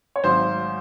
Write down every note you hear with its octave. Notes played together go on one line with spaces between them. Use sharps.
C#5
G#1 G#2 F#3 C5